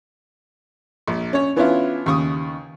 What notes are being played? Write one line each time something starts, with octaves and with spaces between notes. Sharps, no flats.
A#1
C#4 C#5
E3 B3 C#4 D4 E4 F4
D#2 C#3 C#6 D#6